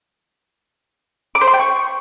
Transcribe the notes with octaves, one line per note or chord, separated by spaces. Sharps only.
D6
C5
C6
G5
C#6